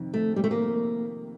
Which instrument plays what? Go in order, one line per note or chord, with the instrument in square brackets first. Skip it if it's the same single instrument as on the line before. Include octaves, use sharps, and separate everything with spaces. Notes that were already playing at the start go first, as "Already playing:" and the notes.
Already playing: [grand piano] F2 C3 D#3
[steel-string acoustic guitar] A3
G3
A3
A#3